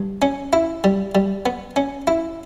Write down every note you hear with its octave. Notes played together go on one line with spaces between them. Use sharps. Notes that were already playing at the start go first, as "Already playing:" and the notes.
Already playing: G2
C#4
E4
G3
G3
B3
C#4
E4